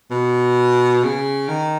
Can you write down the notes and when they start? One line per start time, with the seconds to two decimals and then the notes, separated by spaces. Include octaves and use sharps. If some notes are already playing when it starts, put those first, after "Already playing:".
0.11 B2
1.04 C#3
1.48 D#3